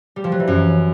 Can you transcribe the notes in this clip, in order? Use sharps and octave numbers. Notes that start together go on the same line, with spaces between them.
G3
F3
F#3
E3
F#2